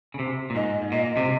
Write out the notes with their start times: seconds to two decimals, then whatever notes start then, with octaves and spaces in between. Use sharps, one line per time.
0.14 C#3
0.19 C3
0.50 A#2
0.55 G#2 D#5
0.82 G#2
0.92 A#2 D#5
1.17 C3